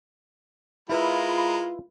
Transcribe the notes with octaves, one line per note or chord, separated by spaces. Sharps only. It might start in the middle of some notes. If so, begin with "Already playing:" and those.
G#3 E4 F4 A#4 B4 E5 B5